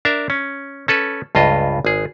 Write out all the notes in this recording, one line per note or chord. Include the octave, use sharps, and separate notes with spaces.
D4 A#4 E5
C#4
C#4 A4 B4
C#2 G2 F4 D#5
G#1 G#4